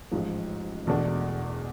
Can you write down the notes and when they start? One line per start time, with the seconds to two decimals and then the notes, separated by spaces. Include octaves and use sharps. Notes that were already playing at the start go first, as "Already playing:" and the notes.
0.12 A1 G#2 F3
0.86 E1 E2 B2 A3 D4